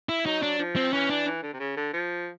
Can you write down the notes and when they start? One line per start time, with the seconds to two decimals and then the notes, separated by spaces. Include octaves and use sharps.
0.09 E4
0.25 F#3 D#4
0.43 D4
0.59 F3
0.76 C4
0.93 E3 C#4
1.10 D4
1.26 E3
1.43 D3
1.53 C3
1.60 C#3
1.77 D3
1.94 F3